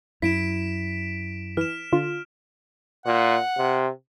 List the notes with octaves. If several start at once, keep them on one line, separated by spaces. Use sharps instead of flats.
F#2 E4 B6 D7 E7
E3 F6 E7
D3 F4
A#2 F#5
C3